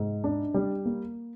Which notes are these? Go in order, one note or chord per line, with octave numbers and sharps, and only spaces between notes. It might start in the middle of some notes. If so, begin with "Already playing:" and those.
Already playing: G#2
D4
G3
A#3